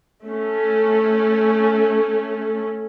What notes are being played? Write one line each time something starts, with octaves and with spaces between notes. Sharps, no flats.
A3 C#4